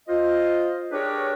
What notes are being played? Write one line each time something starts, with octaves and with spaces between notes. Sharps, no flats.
F4 C5 D#5
D4 G4 G#4 A#4 B4 C#5